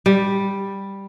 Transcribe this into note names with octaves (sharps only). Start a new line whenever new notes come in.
G3